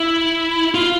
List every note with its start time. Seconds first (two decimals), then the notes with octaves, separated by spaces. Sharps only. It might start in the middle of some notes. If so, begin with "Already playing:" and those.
Already playing: E4
0.74 F4